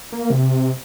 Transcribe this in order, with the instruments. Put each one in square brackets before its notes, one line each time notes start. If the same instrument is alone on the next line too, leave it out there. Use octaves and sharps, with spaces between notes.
[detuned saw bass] A#3
C3